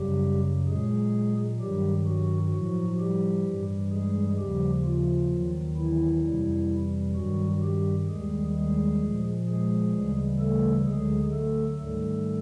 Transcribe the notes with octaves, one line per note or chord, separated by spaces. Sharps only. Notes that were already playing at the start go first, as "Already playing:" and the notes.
Already playing: F#2 C#3 F#3 G3 G4
A#2 F#3 G#3 G#4
G2 D#3 F#3 G3 G4
F#3 F#4
A2 F3 F#3 F#4
G3 G4
G2 E3 G3
G#3 G#4
D#2 C#3 F3 G3 G4
F3 F4
D#2 D#3 F#3
E3 E4
F2 C3 E3 G3
G2 D#3 F#3 G3 F#4
G3 G4
D#2 D#3 G3 G#3 G#4
G#3 G#4
A#2 F3
G#3 G#4
D2 C#3 E3 G3
A3 A4
D2 D3 F#3 G#3 G#4
A3 A4
G#2 D#3 G3 A3 A4